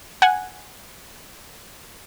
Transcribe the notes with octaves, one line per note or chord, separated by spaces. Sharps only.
F#5 G#5